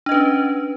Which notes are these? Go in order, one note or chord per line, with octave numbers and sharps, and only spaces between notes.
C#4 D4 B4 D#5